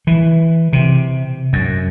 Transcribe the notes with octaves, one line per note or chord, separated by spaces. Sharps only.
E3
C3
F#2